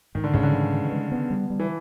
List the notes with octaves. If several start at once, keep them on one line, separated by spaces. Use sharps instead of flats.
G#2 D#3
D3
G#2 C#3
D3
E3
G#3
G#3
B3
G3
G3
E3